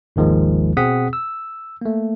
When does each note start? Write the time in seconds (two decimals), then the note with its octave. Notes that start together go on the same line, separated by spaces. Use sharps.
0.16 G#1 D#2 D#3 F3 G#3
0.77 B2 C4 G#4 F#5 D#6 B6
1.13 E6
1.81 A3 A#3